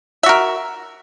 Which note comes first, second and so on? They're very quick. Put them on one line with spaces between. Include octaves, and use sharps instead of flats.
E5 F#4 A#4